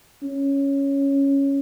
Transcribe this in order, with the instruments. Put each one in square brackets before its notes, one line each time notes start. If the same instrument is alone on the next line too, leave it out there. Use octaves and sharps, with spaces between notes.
[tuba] C#4